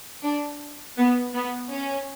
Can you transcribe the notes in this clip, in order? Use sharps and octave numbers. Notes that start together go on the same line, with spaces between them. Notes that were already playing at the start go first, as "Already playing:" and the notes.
D4
B3
B3
C#4